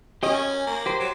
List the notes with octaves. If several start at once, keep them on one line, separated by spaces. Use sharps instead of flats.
C#4 G4 D#5
G#5
A#3
G4 C5
F#3